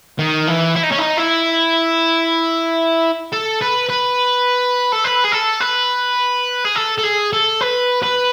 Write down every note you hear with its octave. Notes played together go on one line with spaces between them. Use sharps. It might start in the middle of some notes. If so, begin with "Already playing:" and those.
D#3
E3
E4
D#4
C#4
D#4
E4
A4
B4
B4
A4
B4
G#4
A4
B4
G#4
A4
A4
G#4
A4
B4
B4